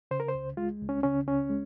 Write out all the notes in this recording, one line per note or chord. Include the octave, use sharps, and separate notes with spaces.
C#3 C5
A#4
C5
C#2
G#3 F4
C#2
C#4
C#3 C#4
C#2 C#4
G#3